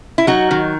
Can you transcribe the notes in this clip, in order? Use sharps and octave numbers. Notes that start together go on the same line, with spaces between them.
E4
F#3 D#4 F#4
D#3